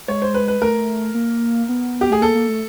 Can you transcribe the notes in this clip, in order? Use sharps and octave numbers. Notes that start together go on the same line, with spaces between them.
G#3 C#5
C5
B4
B4
A3 A#4
A#3
B3
G4
A3 G#4
A#3 A4
A#3
A3